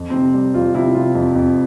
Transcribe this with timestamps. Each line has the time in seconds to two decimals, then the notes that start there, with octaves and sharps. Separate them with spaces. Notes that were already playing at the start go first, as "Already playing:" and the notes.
Already playing: F2
0.10 C3 C4
0.34 G3
0.54 F2 F4
0.75 C3 E4
0.95 C3 F4
1.15 F2
1.35 F2